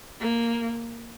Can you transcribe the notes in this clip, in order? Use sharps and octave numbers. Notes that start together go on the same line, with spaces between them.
A#3